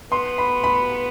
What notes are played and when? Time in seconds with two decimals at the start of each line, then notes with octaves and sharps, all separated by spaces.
0.11 B3 C6
0.38 B5
0.64 B5